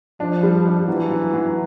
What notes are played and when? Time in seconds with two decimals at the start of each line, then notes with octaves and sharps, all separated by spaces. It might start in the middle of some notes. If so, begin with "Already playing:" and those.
0.20 F3 D4
0.43 G3
0.65 D4
0.88 E3 F#3
1.10 F#3
1.33 F#3